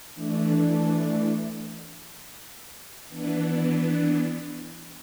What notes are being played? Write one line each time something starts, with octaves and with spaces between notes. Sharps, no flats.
E3 A3 D4
E3 B3 D4